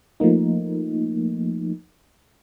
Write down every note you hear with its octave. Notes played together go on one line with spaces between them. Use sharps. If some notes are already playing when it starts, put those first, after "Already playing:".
F3 A3 A#3 D#4